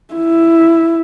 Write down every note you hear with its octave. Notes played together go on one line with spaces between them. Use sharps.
E4